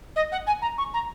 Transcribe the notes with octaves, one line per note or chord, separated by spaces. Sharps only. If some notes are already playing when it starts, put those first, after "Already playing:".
D#5
F#5
G#5
A#5
C#6
A#5